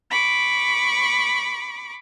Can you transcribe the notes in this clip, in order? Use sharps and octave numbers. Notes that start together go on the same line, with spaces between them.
B5 C#6 D6